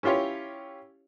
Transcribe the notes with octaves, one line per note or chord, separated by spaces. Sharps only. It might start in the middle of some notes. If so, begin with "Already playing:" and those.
C#4 E4 F4 G4 C#5